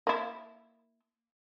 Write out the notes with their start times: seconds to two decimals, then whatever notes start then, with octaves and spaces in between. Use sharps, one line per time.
0.07 A#3 E4